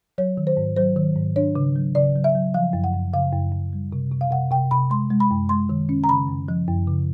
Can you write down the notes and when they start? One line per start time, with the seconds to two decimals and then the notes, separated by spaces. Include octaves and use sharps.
0.18 F#3 C#5
0.37 D#3
0.47 C5
0.57 G#2
0.76 F#3 C5
0.96 D#3
1.16 G#2
1.36 D4 C#5
1.56 C#3
1.75 F#3
1.95 C#3 D5
2.15 F#3
2.24 E5
2.35 F#3
2.54 F3 F5
2.73 F#2
2.84 F#5
2.94 F#2
3.14 C#3 F5
3.33 F#2
3.52 F#2
3.73 G3
3.92 C3
4.12 C3
4.21 F5
4.31 C3 F#5
4.51 C3 G5
4.71 C3 B5
4.90 G#3 C6
5.10 G#3
5.20 B5
5.31 F#2
5.49 G#3 C6
5.69 D#3
5.89 C#4
6.04 A#5
6.09 C#3 B5
6.28 F#2
6.48 F3
6.68 F#2
6.87 C#3